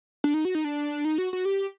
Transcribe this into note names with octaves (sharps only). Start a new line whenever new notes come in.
D4
D#4
F#4
D#4
D4
D#4
F#4
F#4
G4